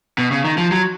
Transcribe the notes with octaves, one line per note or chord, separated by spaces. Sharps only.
B2
C#3
D#3
F3
F#3